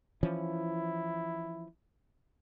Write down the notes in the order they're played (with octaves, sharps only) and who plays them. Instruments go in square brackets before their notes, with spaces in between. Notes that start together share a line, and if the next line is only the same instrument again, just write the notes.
[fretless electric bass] E3 F3 C#4 [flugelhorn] E4